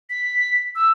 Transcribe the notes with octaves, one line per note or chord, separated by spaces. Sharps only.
B6
E6